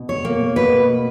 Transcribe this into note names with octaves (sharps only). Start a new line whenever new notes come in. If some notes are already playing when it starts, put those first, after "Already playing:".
Already playing: B2
C#5
A#3
B2 B4